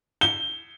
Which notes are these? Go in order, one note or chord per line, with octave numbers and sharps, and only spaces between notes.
G7